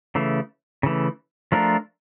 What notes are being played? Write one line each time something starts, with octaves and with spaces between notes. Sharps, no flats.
C#3 E3 A3
C#3 E3 A3
F3 A3 D4 F4 A#4